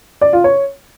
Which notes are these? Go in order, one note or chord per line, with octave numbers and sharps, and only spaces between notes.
D5
F4
C#5